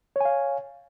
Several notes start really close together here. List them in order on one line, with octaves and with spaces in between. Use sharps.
C#5 G#5 F5